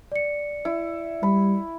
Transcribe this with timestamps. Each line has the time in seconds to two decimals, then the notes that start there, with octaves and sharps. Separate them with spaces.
0.12 D5 C#7
0.65 E4
1.23 G3 B5